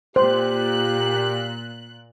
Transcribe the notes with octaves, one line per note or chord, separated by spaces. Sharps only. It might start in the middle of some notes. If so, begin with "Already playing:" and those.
A#2 G4 C5 F#6